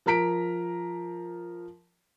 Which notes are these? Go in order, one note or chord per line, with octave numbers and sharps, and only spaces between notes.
F3 A#4 A#5 B6 D7